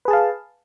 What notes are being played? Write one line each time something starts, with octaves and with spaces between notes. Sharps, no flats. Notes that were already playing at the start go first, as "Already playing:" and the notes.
G#4 B4 F5 A5